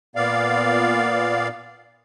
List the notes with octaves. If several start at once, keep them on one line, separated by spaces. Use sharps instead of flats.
A#2 B3 D5 F5